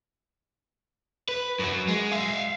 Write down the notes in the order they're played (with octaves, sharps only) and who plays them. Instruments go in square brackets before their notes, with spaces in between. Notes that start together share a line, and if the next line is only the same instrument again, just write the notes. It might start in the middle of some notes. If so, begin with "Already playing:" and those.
[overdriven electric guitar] B4
F#2 F#3
G#3
E5 F5